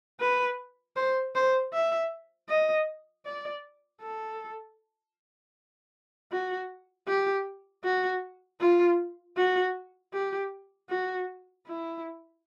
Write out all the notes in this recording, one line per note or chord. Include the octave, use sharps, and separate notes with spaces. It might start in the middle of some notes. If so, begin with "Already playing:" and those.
B4
C5
C5
E5
D#5
D5
A4
F#4
G4
F#4
F4
F#4
G4
F#4
E4